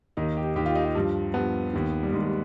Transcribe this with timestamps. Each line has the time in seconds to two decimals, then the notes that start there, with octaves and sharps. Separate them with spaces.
0.17 D#2 D#3 D#4
0.37 G4
0.56 D#2 D#3 G4
0.66 F4
0.75 D#4
0.85 F4
0.95 G2 F3
1.34 G2 F3 B3
1.73 D#2 D#3
2.03 G3
2.12 D#2 D#3 G#3